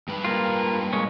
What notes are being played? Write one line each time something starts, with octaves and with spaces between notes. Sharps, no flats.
G#2 G3 B4
A#3 F4
G#3 A#3 C#4